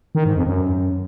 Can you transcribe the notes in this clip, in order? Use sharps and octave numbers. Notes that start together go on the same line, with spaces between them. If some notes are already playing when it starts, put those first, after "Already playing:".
D#3
G#2
F2
F#2